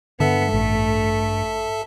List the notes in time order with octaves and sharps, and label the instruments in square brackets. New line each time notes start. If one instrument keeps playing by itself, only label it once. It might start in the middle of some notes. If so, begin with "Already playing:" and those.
[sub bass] G2 [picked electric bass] D3 [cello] B3 [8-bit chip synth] A4 E5 A5
[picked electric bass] A1 [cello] A3